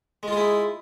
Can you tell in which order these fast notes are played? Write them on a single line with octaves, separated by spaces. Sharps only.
G#3 F4 G#4 E4